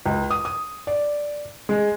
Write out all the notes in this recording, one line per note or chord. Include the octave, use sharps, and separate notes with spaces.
C#2
D#6
D#6
D5
G#3